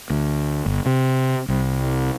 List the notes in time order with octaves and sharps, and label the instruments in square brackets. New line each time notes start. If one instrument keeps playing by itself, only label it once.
[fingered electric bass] D2
G1
C3
C2